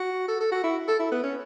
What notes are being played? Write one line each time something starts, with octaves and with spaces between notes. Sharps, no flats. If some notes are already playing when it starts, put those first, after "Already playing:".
Already playing: F#4
A4
A4
F#4
E4
A4
E4
B3
C#4